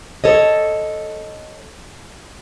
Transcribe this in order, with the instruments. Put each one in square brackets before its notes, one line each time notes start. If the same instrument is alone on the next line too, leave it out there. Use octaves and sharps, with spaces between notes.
[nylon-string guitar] A4 C#5 D#5